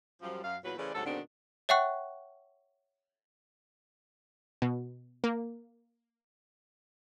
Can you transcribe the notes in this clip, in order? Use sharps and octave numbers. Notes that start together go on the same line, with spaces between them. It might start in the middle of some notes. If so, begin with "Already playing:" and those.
F#2 F3 G3
F#2 F5
E2 A#2 F#3 B4
C#3 E3 A3 B4 C5 D5
D2 G#2 C3 F#3 A4
G#2 B2 D3 D#3 C4 D4
C#5 E5 F#5 G5 C#6 F#6
B2
A#3